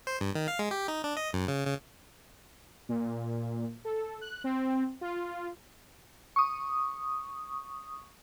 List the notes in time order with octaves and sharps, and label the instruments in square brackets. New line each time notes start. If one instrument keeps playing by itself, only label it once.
[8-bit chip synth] C5
G2
D#3
F5
G#3
G4
D#4
D4
D#5
F#2
C#3
C#3
[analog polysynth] A#2
A4
F#6
C4
F4
[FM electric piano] C#6 D#6